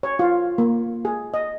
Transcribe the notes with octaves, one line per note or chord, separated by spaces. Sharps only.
C#5
F4
A#3
G#4
D#5